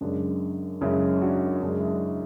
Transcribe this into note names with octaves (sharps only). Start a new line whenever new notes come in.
F#2 C#3 G#3 D4
F#2 C#3 G#3 C#4 E4
D4 F#4
F#2 C#3 G#3 D4
E4
D4